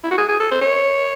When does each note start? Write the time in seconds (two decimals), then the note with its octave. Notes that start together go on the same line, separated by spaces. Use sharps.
0.04 E4
0.11 F#4
0.18 G#4
0.29 G#4
0.40 A4
0.51 C5
0.61 C#5